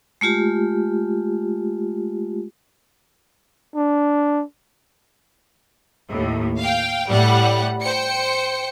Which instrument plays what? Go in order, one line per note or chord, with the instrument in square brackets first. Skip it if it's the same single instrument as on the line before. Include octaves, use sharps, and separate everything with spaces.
[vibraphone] G#3 A3 F4 G4
[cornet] D4
[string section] D#2 A2
F5 G5
A2 G3 F#5
C5 G5 C#7